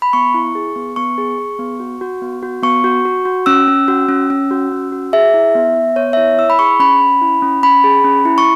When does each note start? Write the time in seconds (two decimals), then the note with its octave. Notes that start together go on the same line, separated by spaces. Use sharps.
0.02 B5
0.13 B3 C#6
0.34 E4
0.55 G#4
0.76 B3
0.96 B3 C#6
1.18 G#4
1.38 G#4
1.59 B3
1.80 F#4
2.01 F#4
2.22 B3
2.43 F#4
2.63 B3 C#6
2.84 F#4
3.05 F#4
3.25 F#4
3.46 C#4 E6
3.68 C#4
3.88 F#4
4.09 C#4
4.30 C#4
4.51 F#4
4.72 C#4
4.92 F#4
5.13 G#4 E5
5.34 E4
5.55 B3
5.75 B3
5.96 B3 C#5
6.13 E5
6.17 E4 C#5
6.38 E4 E6
6.50 B5
6.59 G#4 C#6
6.80 C#4 B5
7.00 C#4
7.21 E4
7.42 C#4
7.63 C#4 B5
7.84 G#4
8.04 C#4
8.25 E4
8.38 C#6